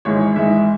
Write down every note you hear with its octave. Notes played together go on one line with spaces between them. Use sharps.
G#1 G#2 E3 G#3 C#5
G#1 G#2 E3 G#3 E5